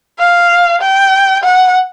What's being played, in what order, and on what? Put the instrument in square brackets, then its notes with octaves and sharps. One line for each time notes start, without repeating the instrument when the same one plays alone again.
[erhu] F5
G5
F#5